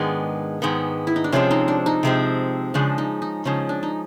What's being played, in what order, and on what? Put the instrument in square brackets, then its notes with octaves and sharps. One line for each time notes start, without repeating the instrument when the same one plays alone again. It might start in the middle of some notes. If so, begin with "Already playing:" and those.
Already playing: [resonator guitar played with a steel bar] G#2 D#3 G#3 B3 [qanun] D4
[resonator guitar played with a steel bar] G#2 D#3 G#3 B3
[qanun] E4
D#4
D4
[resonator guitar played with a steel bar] C3 F3 G#3 C4 [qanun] C#4
[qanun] D#4
D4
D#4
[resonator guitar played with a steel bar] C3 F3 G#3 C4
[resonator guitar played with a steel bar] C#3 F3 G#3 [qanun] D4
[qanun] D#4
D#4
[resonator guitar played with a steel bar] C#3 F3 G#3 [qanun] C#4
[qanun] D4
D#4